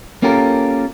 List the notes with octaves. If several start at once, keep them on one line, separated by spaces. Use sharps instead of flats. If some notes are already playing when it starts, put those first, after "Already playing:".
A#3 C#4 F4 G4 A4 A#4